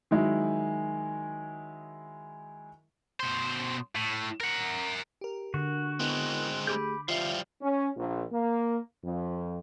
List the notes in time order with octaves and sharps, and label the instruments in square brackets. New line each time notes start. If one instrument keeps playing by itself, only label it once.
[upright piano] D#3 F#3 G#3 E4
[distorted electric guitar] B2 C5
A2
A#4 F#5
[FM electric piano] G4 A#4
[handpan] D3 [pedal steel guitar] F#4
[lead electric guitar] G#3 C4 [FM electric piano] B3 E4 A#4
[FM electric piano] A3 G4 G#4 [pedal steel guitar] B5 D6 G6
[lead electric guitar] F3 G3 [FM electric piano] F4 E5 [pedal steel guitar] F5
[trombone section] C#4
A#1
A#3
F2